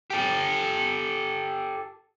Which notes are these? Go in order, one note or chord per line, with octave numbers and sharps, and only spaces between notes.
G4 A4